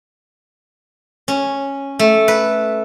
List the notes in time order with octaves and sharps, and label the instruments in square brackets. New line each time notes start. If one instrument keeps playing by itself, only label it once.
[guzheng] C#4
A3
B4